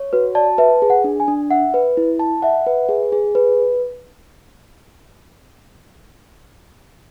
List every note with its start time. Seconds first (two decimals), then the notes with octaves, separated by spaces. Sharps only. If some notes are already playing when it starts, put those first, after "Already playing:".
Already playing: C#5
0.13 F#4 B4
0.35 D5 A5
0.58 B4 E5
0.82 G#4
0.90 F#5
1.04 D4
1.20 G#5
1.28 D4
1.51 E5 F#5
1.74 B4
1.97 E4
2.19 A5
2.42 E5 F#5
2.67 B4
2.89 G#4
3.12 G#4
3.35 B4